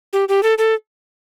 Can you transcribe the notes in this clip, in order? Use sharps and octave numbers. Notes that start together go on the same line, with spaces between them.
G4
G4
A4
A4